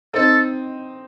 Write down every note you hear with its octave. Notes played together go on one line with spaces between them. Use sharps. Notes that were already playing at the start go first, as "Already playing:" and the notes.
C4 D#4 A4